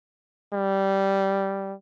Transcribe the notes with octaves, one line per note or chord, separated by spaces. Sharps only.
G3